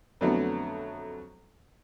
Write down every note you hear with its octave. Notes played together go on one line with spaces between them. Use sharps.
F2 D3 F#3 A3 B3